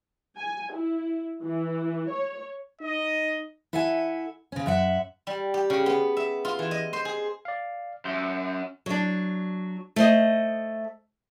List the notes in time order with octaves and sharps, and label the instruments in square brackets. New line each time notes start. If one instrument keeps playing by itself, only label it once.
[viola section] G#5
E4
E3
C#5
[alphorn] D#4 [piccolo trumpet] D#5
[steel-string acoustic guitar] E4 A4 E5 F#5 G#5
C#3 C#4
F#2 E5 F#5
[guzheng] G3
G4
C#3
B3
E5
F4
E3
D#5
C5
G#4
[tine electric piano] D5 F5
[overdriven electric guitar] F#2 [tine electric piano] E5 C6 G6
[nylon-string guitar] F#3 D4
A3 C5 D#5